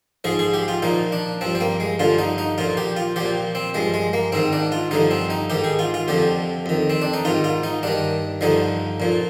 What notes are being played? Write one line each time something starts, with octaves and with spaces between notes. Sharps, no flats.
G#2 F3 G#4
G#4
G4
F4
A#2 F3 D#4
D4
G2 F3 C4
C4
A#3
G#3
G2 D3 F3 F4
D#4
D#4
A#2 F3 F4
G4
F4
A#2 F3 G4
C4
G2 F3 G#3
G#3
A#3
G#2 D#3 C4
D4
F4
G2 D3 F3 D#4
C4
D#4
G#2 D#3 G4
G#4
F4
F4
F2 D3 F3 G4
F2 D#3
C4
D4
D#4
G#2 D#3 F4
F4
D#4
G2 D#3 D4
G2 D3 F3 D#4
A#2 F3